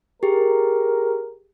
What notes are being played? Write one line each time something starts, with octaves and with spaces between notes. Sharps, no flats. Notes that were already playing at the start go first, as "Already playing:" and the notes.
G4 G#4 A#4